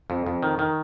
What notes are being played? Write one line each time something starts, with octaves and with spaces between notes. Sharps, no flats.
F2
F2
D#3
D#3